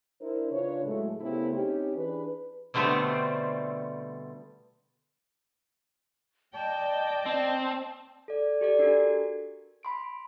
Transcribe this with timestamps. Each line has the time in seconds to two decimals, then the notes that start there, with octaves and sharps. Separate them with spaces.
0.21 D4 E4 A#4 C5
0.51 C#3 D4 F4 B4 C#5
0.84 A2 F#3 G#3 A3
1.21 C#3 A3 B3 E4 G4 C5
1.54 C4 C#4 D#4 G4
1.96 E3 D4 G#4 B4
2.74 B2 D3 G3 A3 B3 C4
6.54 D5 D#5 G5 A5
7.26 C4
8.28 A4 D5
8.61 G4 A4 D5
8.79 D4 F#4 G4 A4 A#4
9.09 G#6
9.83 B5 C6 D7